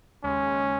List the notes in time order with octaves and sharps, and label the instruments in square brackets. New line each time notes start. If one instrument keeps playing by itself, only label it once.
[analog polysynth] D#2 C#3 G#3 [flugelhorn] C#4